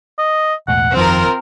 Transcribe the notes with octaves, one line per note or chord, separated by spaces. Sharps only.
D#5
E1 B1 A2 F#5
G1 F2 D#3 C4 F4 A#4